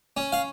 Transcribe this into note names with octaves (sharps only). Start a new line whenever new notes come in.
C#4
F5